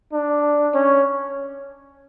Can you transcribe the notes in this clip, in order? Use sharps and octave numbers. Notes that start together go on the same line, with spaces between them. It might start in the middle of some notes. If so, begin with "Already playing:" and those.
D4
C#4